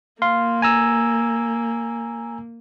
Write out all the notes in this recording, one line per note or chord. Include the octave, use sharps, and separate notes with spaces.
A#3 F5 C6
G#5 A#5 E6